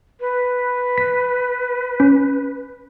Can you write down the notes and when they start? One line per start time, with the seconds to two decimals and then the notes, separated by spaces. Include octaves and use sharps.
0.20 B4
0.98 B6
2.00 C#4